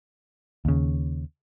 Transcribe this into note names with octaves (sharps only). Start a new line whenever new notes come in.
D#2 C#3